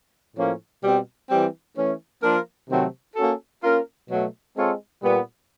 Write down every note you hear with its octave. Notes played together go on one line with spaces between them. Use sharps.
A2 F3 A#3 C#4
B2 G3 C4
E3 G3 C4
E3 A3 C#4
F3 A#3 D4 F4 A#4
C3 D#3 F#3 A3 C4
A#3 C#4 F#4 A4
A#3 C#4 F4 A#4
B2 F#3 A3
G#3 C4 F4 A4 C#5
A#2 G3 B3